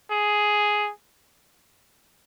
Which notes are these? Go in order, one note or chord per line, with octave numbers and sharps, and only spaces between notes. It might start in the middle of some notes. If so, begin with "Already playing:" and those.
G#4